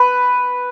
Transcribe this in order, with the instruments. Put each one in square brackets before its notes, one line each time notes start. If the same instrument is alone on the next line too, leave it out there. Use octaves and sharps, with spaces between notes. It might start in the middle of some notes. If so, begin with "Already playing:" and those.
Already playing: [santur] B4